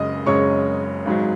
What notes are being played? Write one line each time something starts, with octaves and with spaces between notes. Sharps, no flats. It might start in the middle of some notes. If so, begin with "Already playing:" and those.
Already playing: F#1 F#2 C#3 G#3 D#5 D#6
F#1 F#2 C#3 G#3 C#5 C#6
G#1 G#2 F#3